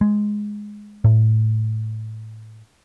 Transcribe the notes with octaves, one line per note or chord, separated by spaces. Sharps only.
G#3
A2